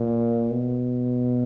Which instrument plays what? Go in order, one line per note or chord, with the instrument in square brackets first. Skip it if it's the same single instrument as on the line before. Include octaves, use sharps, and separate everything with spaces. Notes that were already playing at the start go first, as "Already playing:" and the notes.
Already playing: [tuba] A#2
B2